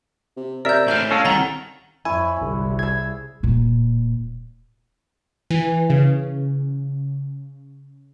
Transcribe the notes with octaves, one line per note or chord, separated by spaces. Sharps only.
C3
C3 A#4 D5 E5 G6
A2 E3 D4 F6 G6
G#3 C#4 A4 F5
C2 D#3 F#5 A#5 A6
F2 E4 C#5 G#5
G1 C2
G#4 E6 G#6
D1 A#2
E3
C#3